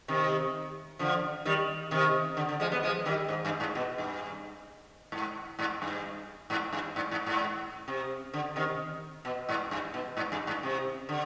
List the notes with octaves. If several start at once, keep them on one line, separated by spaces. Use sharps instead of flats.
C3 D#3
D3 F3
D#3 G3
C3 D#3
D3
D3
F3 G#3
G3 B3
F3 G#3
D#3 G3
G#2
G2
G#2
B2
G2
G#2
G#2
G2
G#2
G2
G#2
G#2
G#2
C3
D3
C3 D#3
B2
G#2
G2
B2
G#2
G2
G#2
C3
D3